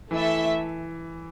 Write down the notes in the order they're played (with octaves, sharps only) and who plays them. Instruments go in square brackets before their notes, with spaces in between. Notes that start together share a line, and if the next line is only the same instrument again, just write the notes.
[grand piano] E3 [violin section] A3 E4 A4 E5